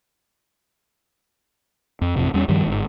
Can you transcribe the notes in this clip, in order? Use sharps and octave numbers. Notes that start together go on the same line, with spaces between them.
F2
A1 F2 C3
E2 G3 C#4
G2 D#3 F3 G3
G1 G#2